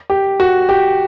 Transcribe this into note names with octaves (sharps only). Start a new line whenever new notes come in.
G4
F#4
G4